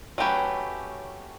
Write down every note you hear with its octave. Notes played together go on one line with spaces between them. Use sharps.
F#3 A3 C#4 G4 B4